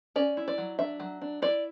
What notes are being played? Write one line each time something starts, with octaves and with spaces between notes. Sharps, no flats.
C#4 D5
E4
D5
F#3
D4 E5
F#3
D4
E4 D5